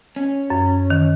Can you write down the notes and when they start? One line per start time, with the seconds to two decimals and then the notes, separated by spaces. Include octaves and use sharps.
0.16 C#4
0.50 F#2
0.90 D#3